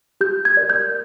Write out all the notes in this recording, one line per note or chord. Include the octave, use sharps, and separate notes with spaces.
G4 G6
G#6
A#4 D5
G6